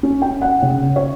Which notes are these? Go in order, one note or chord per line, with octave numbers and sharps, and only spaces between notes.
C#4
G5
F#5
C#3
C#5